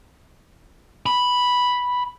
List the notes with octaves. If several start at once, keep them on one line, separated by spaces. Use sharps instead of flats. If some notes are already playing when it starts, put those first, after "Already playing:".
B5